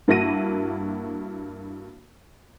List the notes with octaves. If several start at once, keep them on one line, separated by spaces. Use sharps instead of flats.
G2 A#3 E4 F#4 A#6 D#7